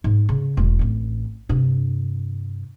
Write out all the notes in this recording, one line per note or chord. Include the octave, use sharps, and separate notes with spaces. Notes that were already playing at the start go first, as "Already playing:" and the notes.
G#2
C#3
E1 G#3
A1 C4
G2 C3